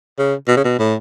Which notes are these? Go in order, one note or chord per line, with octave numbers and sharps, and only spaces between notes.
C#3
B2
C#3
B2
A2